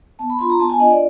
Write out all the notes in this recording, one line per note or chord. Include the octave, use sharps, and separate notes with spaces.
B3 A5
B5
D4 F4 C6
A#5
B3 A5
G#5
D4 F4 D#5
D5